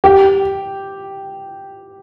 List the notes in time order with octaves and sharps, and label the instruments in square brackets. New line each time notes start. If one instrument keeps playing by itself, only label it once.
[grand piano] G4